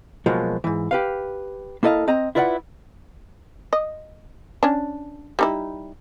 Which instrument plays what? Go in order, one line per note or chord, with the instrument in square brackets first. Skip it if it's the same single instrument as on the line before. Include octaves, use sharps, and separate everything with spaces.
[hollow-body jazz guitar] B2 F3 F#3 G#3 A#3
G#2 E3
G4 B4 F5
A#3 E4 A4 D#5 F5
C4 D#5 A#5
E4 F4 B4 D5 E5 F#5
[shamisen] D#5
C#4 D4
G3 D#4 E4